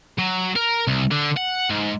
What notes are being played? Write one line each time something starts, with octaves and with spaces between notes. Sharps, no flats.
F#3
A#4
C2
D3
F#5
G#2